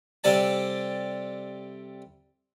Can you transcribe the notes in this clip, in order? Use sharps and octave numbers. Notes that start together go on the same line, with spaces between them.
C3 G3 A4 D5 G#5 A5